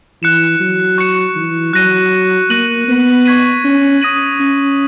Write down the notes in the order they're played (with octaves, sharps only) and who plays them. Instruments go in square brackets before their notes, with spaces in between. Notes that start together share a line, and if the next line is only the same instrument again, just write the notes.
[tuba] E3 [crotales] F#6 C#7 E7
[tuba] F#3
[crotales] C#6 F#6 C#7 E7
[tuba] E3
[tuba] F#3 [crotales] F#6 A#6 D#7
[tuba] A#3 [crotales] F#6 A#6 D#7 F#7
[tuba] B3
[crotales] C#6 G#6 B6 D#7
[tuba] C#4
[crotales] D#6 A#6 D#7 F#7
[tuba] C#4